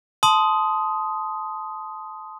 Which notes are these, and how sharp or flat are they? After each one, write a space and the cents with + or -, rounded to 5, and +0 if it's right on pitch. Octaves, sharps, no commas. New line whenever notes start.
A5 -15 C6 -15 D#6 +5